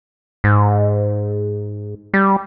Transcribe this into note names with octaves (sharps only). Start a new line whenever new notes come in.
G#2
G3